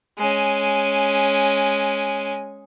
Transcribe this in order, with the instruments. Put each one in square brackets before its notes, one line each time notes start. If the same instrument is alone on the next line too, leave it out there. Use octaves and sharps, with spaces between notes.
[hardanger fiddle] G#3 C#4